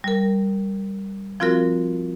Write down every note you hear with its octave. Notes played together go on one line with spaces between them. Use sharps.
G3 A#4
F3 C4 F4 F#4 A#4